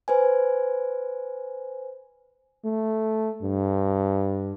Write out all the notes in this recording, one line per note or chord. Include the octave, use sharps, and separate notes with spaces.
B4 C5 G#5
A3
G2